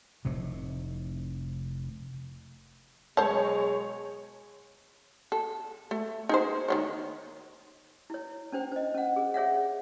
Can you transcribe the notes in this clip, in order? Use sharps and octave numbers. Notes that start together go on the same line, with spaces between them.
F1 A2 C3
B2 F#3 G#3 C5 C#5 A5
A4
A3
D#4 G#4 C5
D#3 B3 C#5
E4 C#5
C#4 D4 C5 G5
C5 D#5
C#4 F#5
G#4
G#4 C#5 E5 F#5